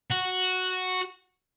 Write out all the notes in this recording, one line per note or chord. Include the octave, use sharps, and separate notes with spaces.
F#4